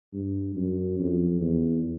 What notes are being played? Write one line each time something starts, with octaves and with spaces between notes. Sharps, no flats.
G2
F#2
F2
E2